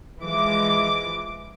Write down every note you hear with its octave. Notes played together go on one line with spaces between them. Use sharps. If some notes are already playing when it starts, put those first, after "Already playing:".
E3 F3 G#3 D6